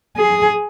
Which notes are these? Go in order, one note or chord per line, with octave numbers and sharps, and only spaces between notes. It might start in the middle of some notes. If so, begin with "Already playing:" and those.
G#4